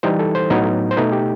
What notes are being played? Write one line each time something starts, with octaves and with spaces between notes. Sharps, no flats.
E3 G3 D#4 C5
A4
C5
A2 F#3 B3 D#4
C5
B2 A3 D#4 B4
G4